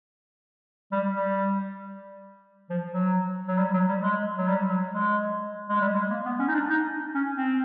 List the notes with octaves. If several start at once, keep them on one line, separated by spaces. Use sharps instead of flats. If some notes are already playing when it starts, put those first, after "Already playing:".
G3
G3
F3
F#3
F#3
G3
F#3
G3
G#3
F#3
G3
F#3
G#3
G#3
G3
G#3
A#3
B3
C#4
D#4
D4
D#4
C#4
C4